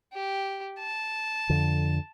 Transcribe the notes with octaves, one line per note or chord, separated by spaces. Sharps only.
G4
A5
F2 D3